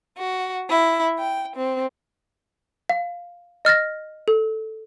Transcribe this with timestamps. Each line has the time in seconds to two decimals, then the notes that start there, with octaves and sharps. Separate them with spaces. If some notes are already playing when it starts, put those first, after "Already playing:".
0.18 F#4
0.68 E4
1.19 G5
1.56 C4
2.89 F5
3.65 D#5 F6 A6 A#6
4.28 A4